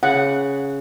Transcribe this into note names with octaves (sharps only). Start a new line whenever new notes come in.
C#3 F#5